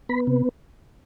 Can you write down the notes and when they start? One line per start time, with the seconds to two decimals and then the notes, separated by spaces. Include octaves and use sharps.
0.09 B3 B5
0.27 C3